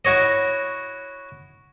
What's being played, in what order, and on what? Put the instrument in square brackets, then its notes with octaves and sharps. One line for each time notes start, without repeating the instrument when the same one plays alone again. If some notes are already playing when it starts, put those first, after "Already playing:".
[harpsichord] E4 F#4 C#5 D#5